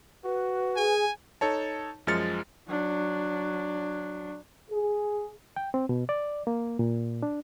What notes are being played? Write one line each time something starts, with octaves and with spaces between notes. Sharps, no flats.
F#4 B4
G#4 G#5
D#4 A4 C#5 A5
F#2 F3 G#3 F6 A6 C#7
F#3 D4
G#4
G5
C4
B2
D5
A#3
A#2
D4